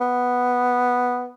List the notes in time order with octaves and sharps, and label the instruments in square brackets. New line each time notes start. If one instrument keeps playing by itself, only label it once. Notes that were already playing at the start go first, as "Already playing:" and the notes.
[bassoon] B3